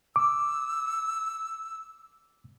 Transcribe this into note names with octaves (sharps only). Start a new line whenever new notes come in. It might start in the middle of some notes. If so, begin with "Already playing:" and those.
D6 E6